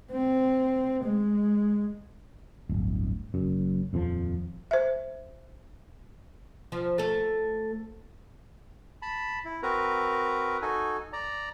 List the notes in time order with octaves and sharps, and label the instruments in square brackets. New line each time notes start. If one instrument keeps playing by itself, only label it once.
[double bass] C4
G#3
[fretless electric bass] D1 G1
F#1 F#2
D#1 F2 B2 F3
[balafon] C5 E5
[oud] F3
A3 A4
[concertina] A5 B5
E4
C4 F#4 A#4 B4 A#5
D#4 F#4 A4 G#5
D5 A#5